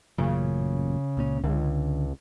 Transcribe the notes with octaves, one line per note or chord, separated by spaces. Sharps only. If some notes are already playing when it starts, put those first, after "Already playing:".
A1 F#2 A#2 C#3
C#2 A#2 C#4
C#2 D3